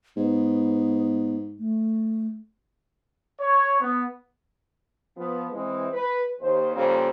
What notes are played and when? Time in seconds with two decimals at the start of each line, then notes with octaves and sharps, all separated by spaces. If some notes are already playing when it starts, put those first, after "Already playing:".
0.17 G#2 B3
1.59 A3
3.40 C#5
3.81 B3
5.17 F3 B3
5.53 E3 G#3 C4
5.93 B4
6.41 D#2 C5
6.75 F2 C#3 G3 A#3 C4 C5